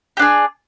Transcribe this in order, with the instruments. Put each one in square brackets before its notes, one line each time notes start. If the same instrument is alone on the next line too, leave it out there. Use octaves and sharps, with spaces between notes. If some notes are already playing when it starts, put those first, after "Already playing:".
[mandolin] G4
D4
G#4